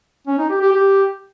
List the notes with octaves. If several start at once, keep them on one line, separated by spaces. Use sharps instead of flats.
C#4
D#4
G4
G4
G4